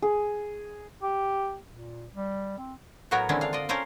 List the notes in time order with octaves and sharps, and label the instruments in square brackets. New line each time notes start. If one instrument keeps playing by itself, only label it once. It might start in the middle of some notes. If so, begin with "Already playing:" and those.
[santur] G#4
[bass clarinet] G4
A#2
G3
C4
[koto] A2 F#3 B3 F#4 A#4 C#5
D3 D#3 G#3 C4 C#4 E4
D4 F5
F4 D5 D#5
C#4 A4 A#4 C5 F5